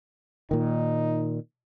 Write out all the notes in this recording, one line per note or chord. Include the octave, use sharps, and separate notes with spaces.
A#2 D#3 D#4